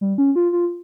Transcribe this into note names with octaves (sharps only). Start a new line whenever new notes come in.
G3
C#4
F4
F4